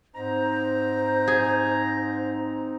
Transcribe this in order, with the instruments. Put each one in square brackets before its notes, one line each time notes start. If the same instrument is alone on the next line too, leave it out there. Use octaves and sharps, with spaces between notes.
[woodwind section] G#2 A#5 [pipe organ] C4 D#4 [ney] C5
[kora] G#4